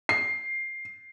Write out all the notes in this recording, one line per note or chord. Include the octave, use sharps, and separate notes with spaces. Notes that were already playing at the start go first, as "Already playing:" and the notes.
C7